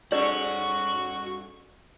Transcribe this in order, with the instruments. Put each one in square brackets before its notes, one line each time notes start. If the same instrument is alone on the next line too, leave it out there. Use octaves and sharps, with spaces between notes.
[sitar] G2 C#4 A4 [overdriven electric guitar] F#4 [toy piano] D5 [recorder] C#6